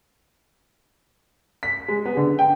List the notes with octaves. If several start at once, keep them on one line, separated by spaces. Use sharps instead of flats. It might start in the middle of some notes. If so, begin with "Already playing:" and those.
B6
G#3
B3
D3
G5